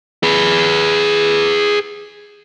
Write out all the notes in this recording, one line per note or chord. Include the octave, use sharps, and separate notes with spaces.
G#4 B4